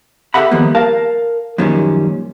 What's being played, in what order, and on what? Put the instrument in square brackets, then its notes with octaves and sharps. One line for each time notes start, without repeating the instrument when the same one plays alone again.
[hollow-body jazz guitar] G4 A4 E5 F#5 B5
D#3 F3 G3 A#3 B3
A#4 F5 A5
F#2 A#2 D#3 F3 G3 C#4